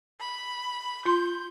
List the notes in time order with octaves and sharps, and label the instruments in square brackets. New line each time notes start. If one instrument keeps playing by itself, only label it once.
[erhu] B5
[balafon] F4 C6 [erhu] G6